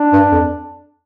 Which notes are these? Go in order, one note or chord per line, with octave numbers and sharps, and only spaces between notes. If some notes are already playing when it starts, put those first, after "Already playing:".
Already playing: D4
G2
F2